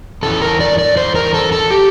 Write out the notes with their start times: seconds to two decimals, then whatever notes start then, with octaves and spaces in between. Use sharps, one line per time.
0.23 E2 E3 A4
0.42 A#4
0.60 D5
0.78 D5
0.97 C5
1.15 A#4
1.34 A4
1.52 A4
1.71 G4